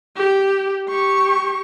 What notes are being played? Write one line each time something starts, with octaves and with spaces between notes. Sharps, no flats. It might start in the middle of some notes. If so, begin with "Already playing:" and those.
G4
G4 C#6